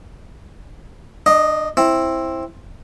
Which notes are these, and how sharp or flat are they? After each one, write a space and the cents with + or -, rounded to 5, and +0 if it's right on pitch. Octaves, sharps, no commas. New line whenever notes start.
D4 +35 D#5 +0
C4 +15 E4 +0